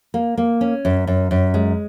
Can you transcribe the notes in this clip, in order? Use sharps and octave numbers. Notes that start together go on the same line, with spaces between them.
A#3
A#3
C#4
F#2
F#2
F#2
G#3